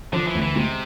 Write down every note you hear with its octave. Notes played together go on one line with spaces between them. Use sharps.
D3 F3
E3
D2
E3
C3 G#3